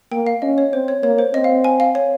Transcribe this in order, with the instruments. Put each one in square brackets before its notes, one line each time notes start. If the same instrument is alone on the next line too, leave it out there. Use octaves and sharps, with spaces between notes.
[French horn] A#3 [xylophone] G5
[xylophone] F5
[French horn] C#4 [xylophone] D#5
[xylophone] C#5
[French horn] C4 [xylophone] C5
[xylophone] C#5
[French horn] A#3 [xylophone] C#5
[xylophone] C5
[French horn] C4 [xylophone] D#5
[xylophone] F5
G#5
F5
C#5